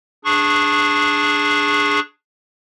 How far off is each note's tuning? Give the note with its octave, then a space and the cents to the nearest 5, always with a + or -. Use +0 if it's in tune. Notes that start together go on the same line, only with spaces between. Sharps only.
D4 +5 G#4 +0 C#6 -20